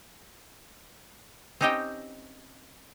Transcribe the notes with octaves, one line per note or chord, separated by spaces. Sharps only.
C4 C#4 D#4 G4 D#5 G5